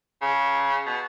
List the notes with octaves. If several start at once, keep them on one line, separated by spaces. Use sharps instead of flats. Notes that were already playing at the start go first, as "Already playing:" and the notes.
C#3
B2